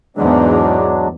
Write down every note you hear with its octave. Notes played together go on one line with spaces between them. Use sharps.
E2 G#2 F#3 G#3 D4